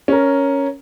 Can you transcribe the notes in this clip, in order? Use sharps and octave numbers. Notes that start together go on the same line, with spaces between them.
C#4 A#4